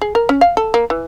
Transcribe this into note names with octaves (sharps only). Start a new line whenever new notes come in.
G#4
A#4
C#4
F5
A4
A#3
E3